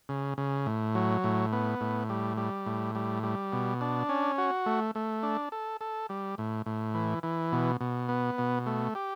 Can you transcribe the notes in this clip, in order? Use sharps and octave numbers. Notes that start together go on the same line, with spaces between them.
C#3
C#3
A2
F#3
A2
B3
A2
G3
G3
A2
G3
G3
B2
D4
C#4
F#4
A3
A3
D4
A4
A4
G3
A2
A2
E3
E3
B2
B2
B3
B2
A3
G4